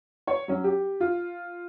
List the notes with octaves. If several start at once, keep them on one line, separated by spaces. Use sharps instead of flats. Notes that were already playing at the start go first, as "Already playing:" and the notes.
C#5
F#3 C#4
G4
F4